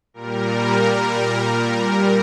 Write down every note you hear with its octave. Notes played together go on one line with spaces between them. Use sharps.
A#2 G3 A#4